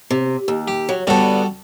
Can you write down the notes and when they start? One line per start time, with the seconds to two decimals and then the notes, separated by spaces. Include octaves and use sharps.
0.10 C3
0.48 D#2
0.68 G4
0.89 F#3
1.07 D3 G3 B3 F#4 A4